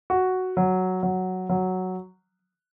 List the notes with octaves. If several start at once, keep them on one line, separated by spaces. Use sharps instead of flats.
F#4
F#3
F#3
F#3